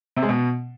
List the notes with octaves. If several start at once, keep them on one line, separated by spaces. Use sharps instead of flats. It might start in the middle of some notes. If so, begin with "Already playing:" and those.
C3
G#3
B2